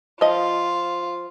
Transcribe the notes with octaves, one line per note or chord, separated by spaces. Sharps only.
F3 F4 D#5